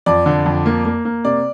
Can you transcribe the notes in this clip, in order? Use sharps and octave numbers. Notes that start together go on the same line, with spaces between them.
F2 D5
D3
F2
A#3
A#3
A#3
C3 D5